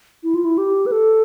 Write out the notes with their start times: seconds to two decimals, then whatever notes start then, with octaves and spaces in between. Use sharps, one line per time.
0.24 E4
0.35 F4
0.45 E4
0.58 G4
0.86 B4
0.92 A4